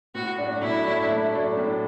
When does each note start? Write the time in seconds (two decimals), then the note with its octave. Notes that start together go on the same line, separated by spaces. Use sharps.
0.15 A2 F#4
0.38 F#3 A3 D4
0.61 A2 E4
0.86 F#3 A3 D4
1.09 A2
1.33 F#3 A3 D4
1.57 A2